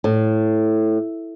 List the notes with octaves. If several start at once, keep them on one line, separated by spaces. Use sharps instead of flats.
A2